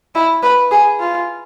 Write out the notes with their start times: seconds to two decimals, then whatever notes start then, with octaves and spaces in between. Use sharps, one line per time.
0.15 E4
0.43 B4
0.71 G#4
1.00 F4